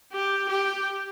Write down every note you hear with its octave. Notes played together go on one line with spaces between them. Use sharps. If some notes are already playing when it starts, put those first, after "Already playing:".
G4
G4